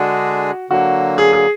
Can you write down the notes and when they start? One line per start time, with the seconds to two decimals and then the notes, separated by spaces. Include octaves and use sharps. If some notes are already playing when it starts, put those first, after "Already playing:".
Already playing: D3 G#3 D4 F#4 G#4
0.70 D3 F#3 A#3 F#4
1.18 G#4
1.33 G#4